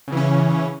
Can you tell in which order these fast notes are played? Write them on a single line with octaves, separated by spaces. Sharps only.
C#3 E3 C#4